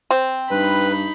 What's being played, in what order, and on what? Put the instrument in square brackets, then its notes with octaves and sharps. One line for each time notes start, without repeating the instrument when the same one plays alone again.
[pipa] C4
[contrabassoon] G2 [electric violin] D#4 B5 [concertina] B4